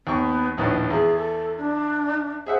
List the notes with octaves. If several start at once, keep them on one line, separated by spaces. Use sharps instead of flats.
D#2 B3 C#6
A#1 D#2 A2 B4
E2 G#4
A4
D4
G#4 C5 E5 F#5